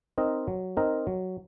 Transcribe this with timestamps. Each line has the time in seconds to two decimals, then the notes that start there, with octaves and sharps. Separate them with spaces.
0.18 C4 D#4 A#4 D#5
0.48 F#3
0.77 C4 D#4 A#4 D#5
1.07 F#3